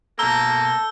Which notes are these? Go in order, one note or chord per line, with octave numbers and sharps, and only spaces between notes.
B2 A#3 A4 A#5 E6 G6 G7